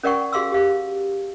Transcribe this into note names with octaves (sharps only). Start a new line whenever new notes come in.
C#4 A#4 D5 F#5 G5 C#6
F#4 G#4 F5 C6 E6
G4 F5